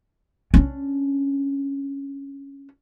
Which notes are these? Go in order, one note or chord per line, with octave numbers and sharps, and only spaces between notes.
C#4 D4